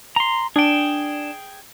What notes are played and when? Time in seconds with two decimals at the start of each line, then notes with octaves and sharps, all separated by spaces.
0.16 A#5 C6
0.56 D4 G#4 G5 E7